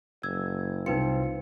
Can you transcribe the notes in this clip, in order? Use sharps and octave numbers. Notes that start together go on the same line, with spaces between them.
F#1 E6 G#6
C2 C4 D#4 F4 B4 C#7